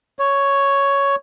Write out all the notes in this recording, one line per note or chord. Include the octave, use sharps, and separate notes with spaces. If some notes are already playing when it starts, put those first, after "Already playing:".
C#5